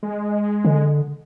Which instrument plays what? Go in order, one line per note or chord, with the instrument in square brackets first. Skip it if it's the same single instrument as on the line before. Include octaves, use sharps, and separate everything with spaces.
[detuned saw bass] G#3
[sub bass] D3